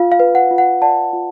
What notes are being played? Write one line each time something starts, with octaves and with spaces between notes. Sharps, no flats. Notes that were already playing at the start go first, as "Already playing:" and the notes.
Already playing: F4 F5
F5
B4
F#5
F4
F#5
D5 F#5 A5
F4